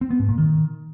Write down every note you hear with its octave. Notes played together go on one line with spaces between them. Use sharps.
C4
B3
G#2
A#2
D#3